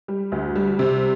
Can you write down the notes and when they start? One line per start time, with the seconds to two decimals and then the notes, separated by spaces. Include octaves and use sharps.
0.08 G3
0.32 D2
0.56 G3
0.79 C3